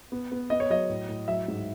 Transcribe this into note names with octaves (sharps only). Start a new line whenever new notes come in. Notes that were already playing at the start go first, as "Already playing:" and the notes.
B3
B3
B3 D#5
C#5
F#3 D#5
A2
A2
F#3 E5
G#2